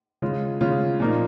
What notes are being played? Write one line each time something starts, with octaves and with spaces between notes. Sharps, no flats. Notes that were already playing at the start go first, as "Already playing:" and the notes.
C#3 G#3 F4
C#3 G#3 F4
A#2 F3 A#3 D#4